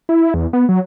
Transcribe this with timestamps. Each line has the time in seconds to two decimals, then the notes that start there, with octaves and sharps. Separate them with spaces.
0.09 E4
0.34 E2
0.53 B3
0.69 F#3